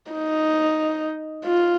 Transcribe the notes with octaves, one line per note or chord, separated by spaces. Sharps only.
D#4
F4